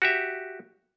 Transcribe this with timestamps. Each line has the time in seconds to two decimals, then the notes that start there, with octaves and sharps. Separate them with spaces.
0.02 F#4 G4 E5